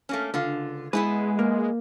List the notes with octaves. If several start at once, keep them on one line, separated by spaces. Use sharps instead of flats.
A3 A#3 C#4
C#2 D3 F4
G#3 B3 E4 G#4 B4
A#3